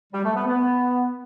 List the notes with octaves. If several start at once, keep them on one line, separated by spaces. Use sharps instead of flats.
G3
A3
B3
B3